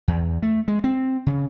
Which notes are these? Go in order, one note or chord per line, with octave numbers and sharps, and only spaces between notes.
E2
A3
G#3
C4
C#3